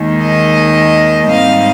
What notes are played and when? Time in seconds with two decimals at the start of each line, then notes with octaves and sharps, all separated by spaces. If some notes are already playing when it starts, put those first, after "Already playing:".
Already playing: D#2 D#3 G#3
0.21 D#5
1.29 G#2 G3 C4 D#4 F5